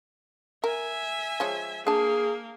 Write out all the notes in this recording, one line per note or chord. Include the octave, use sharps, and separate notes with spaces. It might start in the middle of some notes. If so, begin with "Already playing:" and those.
A#4 E5 G#5
F3 G#3 C#5
A#3 D4 G#4 A5